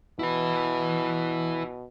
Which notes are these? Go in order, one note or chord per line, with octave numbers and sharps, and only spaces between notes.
B2 E4 B4